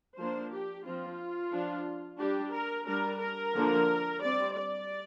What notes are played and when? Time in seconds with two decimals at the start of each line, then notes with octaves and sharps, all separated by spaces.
0.18 F3 A#3 D4 C5
0.52 G4
0.85 F3 C4 F4
1.52 F3 D4
2.19 G3 D4 G4
2.53 A#4
2.87 G3 D4 A#4
3.19 A#4
3.54 D3 F3 A#3 D4
4.21 G3 C4 D5
4.54 D5